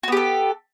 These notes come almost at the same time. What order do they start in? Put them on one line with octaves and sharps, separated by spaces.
F#4 B3 G4 A4